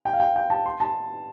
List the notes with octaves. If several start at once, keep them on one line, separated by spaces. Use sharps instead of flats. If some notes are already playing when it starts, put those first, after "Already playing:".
G5
F5
G5
G5
A5
C6
A5